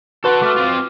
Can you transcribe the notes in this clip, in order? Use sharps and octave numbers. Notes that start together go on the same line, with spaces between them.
F#4 A4 B4 F#5 C6
A3 D6 F6
C4 F4